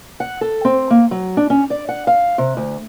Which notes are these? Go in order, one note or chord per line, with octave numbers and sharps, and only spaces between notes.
F#5
A4
C4
A#3
F#3
D4
C#4
D5
F#5
F5
C3
D2